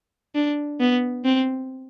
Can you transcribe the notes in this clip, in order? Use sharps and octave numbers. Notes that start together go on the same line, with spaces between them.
D4
B3
C4